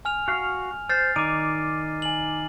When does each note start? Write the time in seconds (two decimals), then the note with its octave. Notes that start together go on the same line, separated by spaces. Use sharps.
0.05 G#5 F6 F7
0.28 F#4 F5
0.89 C5 F6 A6 C7
1.16 D#3 D#4 D5 D6 D#7
2.02 G#5 F#7